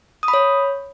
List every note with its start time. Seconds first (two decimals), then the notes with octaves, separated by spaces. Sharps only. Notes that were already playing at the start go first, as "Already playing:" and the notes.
0.23 D#6
0.28 B5
0.34 C#5